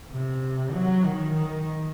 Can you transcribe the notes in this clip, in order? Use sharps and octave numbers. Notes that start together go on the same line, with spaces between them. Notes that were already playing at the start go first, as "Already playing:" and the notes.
C3
F#3
D#3
D#3